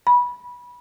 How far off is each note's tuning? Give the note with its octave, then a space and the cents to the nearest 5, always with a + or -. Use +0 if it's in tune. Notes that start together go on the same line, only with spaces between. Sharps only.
B5 -20